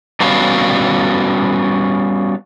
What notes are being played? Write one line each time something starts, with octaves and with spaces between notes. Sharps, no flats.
G3 B3 C#4 F#4 F5 A5